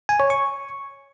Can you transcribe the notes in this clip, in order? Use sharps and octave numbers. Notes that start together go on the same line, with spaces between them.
G#5
C#5
C#6